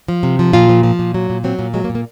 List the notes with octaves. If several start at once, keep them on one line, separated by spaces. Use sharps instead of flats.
F3
C3
F3
A#2 F4
F3
F3
A#2
F#3
A#2
F#3 C4
A#2
F#3 G#3
A#3
A#2
A#3